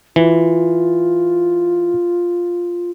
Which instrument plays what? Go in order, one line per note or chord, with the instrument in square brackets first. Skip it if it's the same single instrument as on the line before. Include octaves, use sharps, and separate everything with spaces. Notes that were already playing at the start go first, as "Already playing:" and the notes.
[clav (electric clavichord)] E3 [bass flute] F4